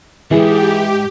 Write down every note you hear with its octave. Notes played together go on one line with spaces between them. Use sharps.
F2 G#2 E3 G4 G#4